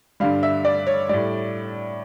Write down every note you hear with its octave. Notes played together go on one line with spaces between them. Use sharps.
G2 D3 G3 F5
E5
D5
C#5
A2 G3 D5